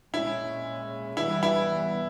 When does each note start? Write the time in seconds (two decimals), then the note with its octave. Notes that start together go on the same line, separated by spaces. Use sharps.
0.13 A#2 G#3 C#4 E4
1.17 E3 G3 B3 E4
1.43 E4